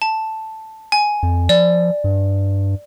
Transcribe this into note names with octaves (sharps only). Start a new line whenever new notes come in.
A5
G#5
F2
F3 D5
G2